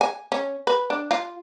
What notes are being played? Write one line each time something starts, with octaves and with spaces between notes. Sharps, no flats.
G#5
C#4
B4
D4
F4